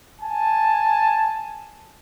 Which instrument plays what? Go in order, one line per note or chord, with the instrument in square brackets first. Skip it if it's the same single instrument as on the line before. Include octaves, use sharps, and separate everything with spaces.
[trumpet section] G#5 A5